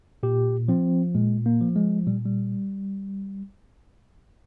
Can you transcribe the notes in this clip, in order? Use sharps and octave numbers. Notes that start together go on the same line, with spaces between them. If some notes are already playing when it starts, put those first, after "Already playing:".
A#2 G4
F3 C4
A#2 G#3
A#3
F3
G#3
A#2 G3
G3